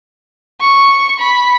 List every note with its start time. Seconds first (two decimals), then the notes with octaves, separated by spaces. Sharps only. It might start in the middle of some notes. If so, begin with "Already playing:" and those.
0.60 C#6
1.19 B5